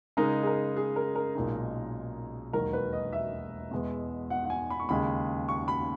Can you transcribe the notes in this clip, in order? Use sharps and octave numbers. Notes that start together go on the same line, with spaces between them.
C#3 G#3 D#4 A#4
G#4
A#4
G#4
A#4
A#4
B1 A#2 G#3 D#4
E1 D#2 D#3 F#3 A#4
B4
D#5
E5
E2 B2 G#3 B3
F#5
F#5
G#5
B5
C#6
D#2 C#3 G#3 B5
C#6
B5